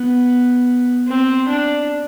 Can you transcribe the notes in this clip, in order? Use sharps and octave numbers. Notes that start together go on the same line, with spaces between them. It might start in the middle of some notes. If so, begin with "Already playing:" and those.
Already playing: B3
C4
D4